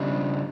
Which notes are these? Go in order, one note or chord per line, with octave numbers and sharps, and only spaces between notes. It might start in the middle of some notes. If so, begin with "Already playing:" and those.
Already playing: C#3 G3 D4